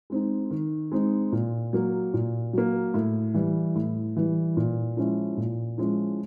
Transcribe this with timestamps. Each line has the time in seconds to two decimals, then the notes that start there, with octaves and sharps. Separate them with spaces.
0.10 G#3 C4 D#4
0.51 D#3
0.92 G#3 C4 D#4
1.32 A#2
1.73 F#3 A#3
2.14 A#2
2.53 F#3 A#3
2.94 A2
3.34 E3 G3
3.75 A2
4.16 E3 G3
4.57 A#2
4.97 F3 G#3 C#4 E4
5.37 A#2
5.78 F3 G#3 C#4 E4